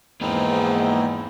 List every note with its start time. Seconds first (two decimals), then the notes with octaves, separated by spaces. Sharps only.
0.21 E2 G#2 F3 A#3 C4 D#4 B4